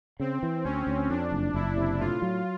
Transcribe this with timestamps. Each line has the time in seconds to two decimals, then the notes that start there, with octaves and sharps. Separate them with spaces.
0.20 C#3 C4
0.43 E3
0.64 D2 C#4
0.87 D2
1.10 F2 D4
1.32 F#1
1.54 F#1 E4
1.77 C3
2.00 A2 F4
2.22 F#3